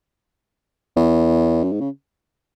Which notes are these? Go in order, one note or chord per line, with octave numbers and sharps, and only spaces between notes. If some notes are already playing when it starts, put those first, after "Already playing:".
E2
F#2
G#2
C#3